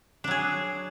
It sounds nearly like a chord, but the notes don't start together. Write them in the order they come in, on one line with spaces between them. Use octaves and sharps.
D4 F#3 G#4